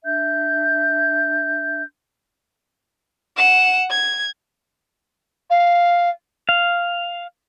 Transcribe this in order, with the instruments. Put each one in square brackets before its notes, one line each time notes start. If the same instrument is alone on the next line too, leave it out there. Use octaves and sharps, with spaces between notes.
[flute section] D4 E5 G6
[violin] F#5 E7
G#6
[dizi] F5
[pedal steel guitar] F5